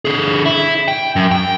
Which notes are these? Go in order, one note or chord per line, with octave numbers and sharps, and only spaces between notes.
D3 G#4
E4
G5
F#2
G5